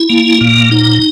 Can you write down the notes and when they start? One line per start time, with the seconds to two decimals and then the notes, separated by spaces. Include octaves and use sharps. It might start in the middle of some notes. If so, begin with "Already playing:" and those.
Already playing: E4
0.10 A#3
0.41 A#2
0.71 D#4